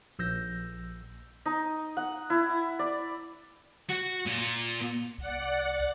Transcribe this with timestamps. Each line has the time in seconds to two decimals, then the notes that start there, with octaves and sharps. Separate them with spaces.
0.19 A#1 E6 G6 A#6
1.46 D#4
1.97 F#5
2.30 E4
2.79 D5
3.90 F#4
4.26 A#2
5.18 C2 D5 F#5